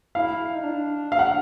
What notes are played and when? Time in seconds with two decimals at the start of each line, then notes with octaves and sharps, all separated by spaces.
0.15 E4 F5
0.55 D#4
0.63 D4
1.12 F5
1.19 F#5